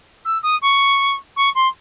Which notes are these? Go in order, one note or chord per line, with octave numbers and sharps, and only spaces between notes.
E6
D#6
C#6
C#6
C6